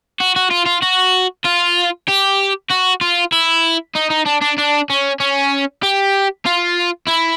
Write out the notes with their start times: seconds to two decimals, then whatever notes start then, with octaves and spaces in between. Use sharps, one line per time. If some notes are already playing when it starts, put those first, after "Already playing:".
0.20 F#4
0.36 F#4
0.51 F4
0.66 F4
0.83 F#4
1.45 F4
2.08 G4
2.70 F#4
3.01 F4
3.32 E4
3.95 D#4
4.11 D#4
4.26 D4
4.42 D4
4.58 D4
4.90 C#4
5.20 C#4
5.83 G4
6.46 F4
7.08 E4